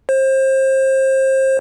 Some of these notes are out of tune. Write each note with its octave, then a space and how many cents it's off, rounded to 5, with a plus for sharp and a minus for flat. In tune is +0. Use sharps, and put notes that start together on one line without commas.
C5 +30